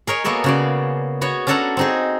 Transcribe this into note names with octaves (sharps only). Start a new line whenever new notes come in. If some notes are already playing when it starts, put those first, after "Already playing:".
G#4 A#4 C#5 D#5
A#3 B3 F#4 G#4 A4
C#3 F#4 D5
B3 F#4 C#5
C#4 D4 F#4 A4 F#5 A#5
C4 D#4 G#4